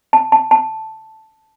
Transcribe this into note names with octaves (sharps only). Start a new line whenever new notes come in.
A5
A5
A5